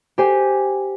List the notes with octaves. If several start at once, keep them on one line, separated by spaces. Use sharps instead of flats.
G4 C5 G#5